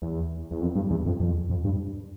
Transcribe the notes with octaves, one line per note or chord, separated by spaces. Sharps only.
E2
E2
F2
G2
E2
F2
F2
F2
G2